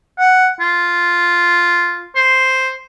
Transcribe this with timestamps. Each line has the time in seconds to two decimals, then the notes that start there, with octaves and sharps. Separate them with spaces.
0.19 F#5
0.60 F4
2.15 C5